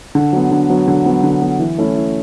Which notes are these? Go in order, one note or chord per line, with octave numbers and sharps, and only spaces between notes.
D3
F#3 B3
D3
F#3 B3
D3
F#3 B3
D3
F#3 B3
E3
A3 C#4 E4
E3